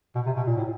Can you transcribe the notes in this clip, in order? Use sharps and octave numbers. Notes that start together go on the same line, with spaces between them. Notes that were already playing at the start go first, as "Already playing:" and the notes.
B2
C3
B2
A#2
A2